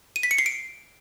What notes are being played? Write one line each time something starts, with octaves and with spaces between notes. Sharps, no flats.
D#7
B6
C#7
C7
D7